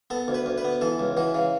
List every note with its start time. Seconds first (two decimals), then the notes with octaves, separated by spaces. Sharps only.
0.10 B3 A4
0.28 D2
0.34 B4
0.46 D2
0.58 B4
0.65 B3
0.81 E3 A4
0.99 C#2
1.17 E3 F#4
1.35 C#3